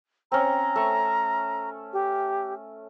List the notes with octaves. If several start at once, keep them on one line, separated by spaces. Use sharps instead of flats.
C4 C#4 A#5
A3 C#6
G4